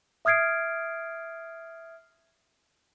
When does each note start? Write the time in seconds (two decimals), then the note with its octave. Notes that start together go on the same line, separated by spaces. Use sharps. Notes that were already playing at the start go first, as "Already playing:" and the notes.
0.25 E5 D#6 F6 G#6 C7 D7